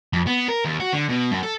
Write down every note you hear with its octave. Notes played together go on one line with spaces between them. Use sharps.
F2
B3
A#4
D#2
F#4
D3
B2
F#2
A4